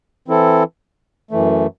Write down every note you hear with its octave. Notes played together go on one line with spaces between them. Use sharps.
E3 C4 E4 A4
F#2 E3 A3